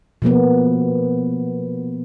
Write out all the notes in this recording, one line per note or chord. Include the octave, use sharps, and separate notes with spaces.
B2 F3 A#3 B3